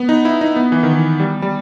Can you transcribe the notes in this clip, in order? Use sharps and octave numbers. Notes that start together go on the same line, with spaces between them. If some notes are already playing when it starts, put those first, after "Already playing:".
Already playing: B3
D#4
E4
D#4
B3
E3
D#3
E3
G3
G3